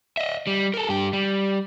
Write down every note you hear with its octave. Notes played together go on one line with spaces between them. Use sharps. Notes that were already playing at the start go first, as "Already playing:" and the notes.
D#5 E5
G3
A4 A#4
G2 G4
G3